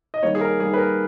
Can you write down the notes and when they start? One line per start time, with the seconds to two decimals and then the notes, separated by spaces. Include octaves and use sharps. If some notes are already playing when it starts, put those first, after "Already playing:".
0.14 D#5
0.22 D#3 G3 A#3 C#5
0.35 G#4
0.41 A#4
0.60 D#3 G3 A#3 G#4
0.74 B4
0.78 A#4